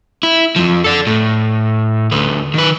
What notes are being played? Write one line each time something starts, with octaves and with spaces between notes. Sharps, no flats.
E4
F2 F3
A4 D5
A2
D2 B4
D#3 B4